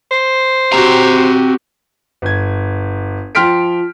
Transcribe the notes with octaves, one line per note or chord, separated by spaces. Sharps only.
C5
C4 F#4 G4 A#5
G1 G#6
F3 G5 C6 F6 B6 D7